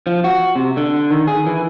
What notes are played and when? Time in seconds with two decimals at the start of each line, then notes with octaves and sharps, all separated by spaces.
0.07 F3
0.24 F#4
0.56 C3
0.77 D3
1.10 D#3
1.27 G#4
1.47 E3